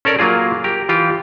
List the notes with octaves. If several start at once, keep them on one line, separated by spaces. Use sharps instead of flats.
C#4 A4 A#4 D5
F#3 A#3 F4 G#4
G4 A#4
E3 F4 G4